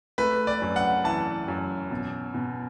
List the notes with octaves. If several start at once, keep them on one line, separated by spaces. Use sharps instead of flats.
A3 B4
D5
F#2
F#5
E3 A5
F#2
B2
B2